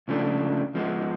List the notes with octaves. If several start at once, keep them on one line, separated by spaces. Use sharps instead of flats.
C#2 C#3 F3 A3 D4
F3 G#3 B3